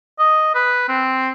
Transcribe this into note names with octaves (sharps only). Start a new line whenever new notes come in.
D#5
B4
C4